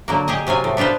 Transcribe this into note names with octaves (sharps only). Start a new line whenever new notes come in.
D3 F#3 A#3
G4 G#4 D#5
C3 F#3 F4 G#5
A2
B3 D4 F4 B4 C5